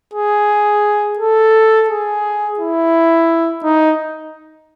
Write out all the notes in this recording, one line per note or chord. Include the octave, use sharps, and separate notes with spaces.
G#4
A4
G#4
E4
D#4